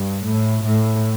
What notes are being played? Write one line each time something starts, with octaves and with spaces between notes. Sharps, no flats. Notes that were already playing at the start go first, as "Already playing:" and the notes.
Already playing: G2
A2
A2